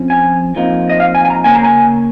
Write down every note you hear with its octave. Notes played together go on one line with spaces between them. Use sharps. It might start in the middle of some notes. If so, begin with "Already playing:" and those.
Already playing: F2 F3 C#4
G#5
F2 F3 A#3 D#4
D#5
F5
G#5
G#5
A#5
C#3 A#3 C#4 G#5
A#5
G#5